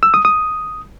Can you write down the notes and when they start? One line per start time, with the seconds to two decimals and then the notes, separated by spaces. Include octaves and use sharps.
0.03 E6
0.14 D#6
0.25 D#6